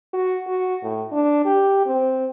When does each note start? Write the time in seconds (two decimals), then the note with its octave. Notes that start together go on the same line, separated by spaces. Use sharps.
0.13 F#4
0.47 F#4
0.83 A2
1.12 D4
1.45 G4
1.86 C4